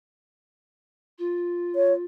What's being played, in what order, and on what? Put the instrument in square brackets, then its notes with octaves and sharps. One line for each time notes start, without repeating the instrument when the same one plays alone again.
[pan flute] F4
[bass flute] C#5